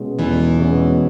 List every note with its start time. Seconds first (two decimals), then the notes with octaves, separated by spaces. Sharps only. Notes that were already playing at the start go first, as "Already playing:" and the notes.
Already playing: B1 B2 G#3 C#4
0.19 B1 E2 E3
0.59 B2 G#3 C#4